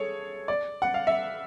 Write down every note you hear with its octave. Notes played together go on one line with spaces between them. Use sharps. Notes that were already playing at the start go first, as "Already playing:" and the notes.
Already playing: G#4 A4 C#5
D5
F#5
F5
E5